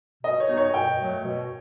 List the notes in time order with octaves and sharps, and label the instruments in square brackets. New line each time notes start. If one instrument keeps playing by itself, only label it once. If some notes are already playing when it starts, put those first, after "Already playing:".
[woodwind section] B2 [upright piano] D#5
[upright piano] C#5
[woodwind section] F#3 B3 D#4
[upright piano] C#5
[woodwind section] B2 [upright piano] G5
[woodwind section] F#3 A3
B2